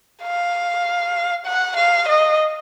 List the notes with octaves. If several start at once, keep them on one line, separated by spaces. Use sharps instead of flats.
F5
F#5
F5
D#5